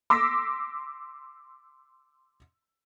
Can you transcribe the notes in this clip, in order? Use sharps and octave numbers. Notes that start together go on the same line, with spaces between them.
C6 D6 E6 A#6 B6